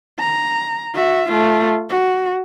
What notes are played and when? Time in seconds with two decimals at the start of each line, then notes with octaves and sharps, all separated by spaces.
0.19 A#5
0.94 F#4 E5
1.29 A3 F4
1.89 F#4